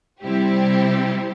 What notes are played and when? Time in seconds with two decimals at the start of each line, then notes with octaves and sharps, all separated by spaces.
0.22 C3 G3 C4 E4 G4